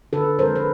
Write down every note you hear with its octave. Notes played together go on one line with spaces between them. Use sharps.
D3 A4 B4
F3 G#3 A#4 C5
B4